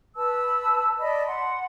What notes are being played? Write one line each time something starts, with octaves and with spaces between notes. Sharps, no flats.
B4 A5 E6
D5 D#5 A5 B5
F#5 C6